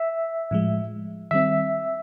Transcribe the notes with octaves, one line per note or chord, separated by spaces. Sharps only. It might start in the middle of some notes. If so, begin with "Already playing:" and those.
Already playing: E5
A2 F3 G#3
D#3 G3 C4 E5